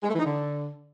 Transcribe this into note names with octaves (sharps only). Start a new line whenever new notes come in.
G#3
A3
E3
D#4
D3